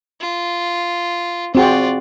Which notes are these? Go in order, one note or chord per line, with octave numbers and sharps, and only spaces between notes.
F4
C4 F4 F#4 G#4 D5